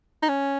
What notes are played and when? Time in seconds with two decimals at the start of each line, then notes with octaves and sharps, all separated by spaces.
0.22 D#4
0.28 C#4